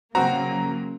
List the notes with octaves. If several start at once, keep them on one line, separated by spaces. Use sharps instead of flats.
C#3 F#3 A#3 C4 F#4 A#5